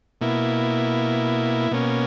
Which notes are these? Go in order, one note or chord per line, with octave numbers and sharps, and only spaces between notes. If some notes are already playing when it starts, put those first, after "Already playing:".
B2 A#3 E4
B2 A#3 C#4